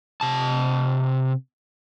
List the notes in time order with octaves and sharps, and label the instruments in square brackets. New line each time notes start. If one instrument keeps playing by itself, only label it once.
[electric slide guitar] C3 A5